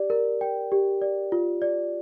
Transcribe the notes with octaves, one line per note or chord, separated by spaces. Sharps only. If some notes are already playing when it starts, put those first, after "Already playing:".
Already playing: G4 D5
A#4
G5
G4
D5
F4
D5